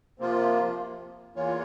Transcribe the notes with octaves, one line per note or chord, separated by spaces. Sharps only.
C3 F3 A#3 F4
E2 E3 A#3 F4 C#5